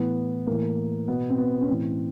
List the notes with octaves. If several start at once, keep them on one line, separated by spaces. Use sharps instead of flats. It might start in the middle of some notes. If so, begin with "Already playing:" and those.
Already playing: A2 E3 B3
A2 E3 A#3
B2 B3
C4
B3
C#4
A2 E3 C4